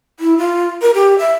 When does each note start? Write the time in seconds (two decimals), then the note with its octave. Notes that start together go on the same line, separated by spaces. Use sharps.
0.20 E4
0.38 F4
0.82 A#4
0.94 G4
1.18 E5